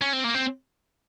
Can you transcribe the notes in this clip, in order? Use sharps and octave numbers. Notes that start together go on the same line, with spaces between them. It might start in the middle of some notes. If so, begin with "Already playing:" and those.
C#4
C4
A#3
C4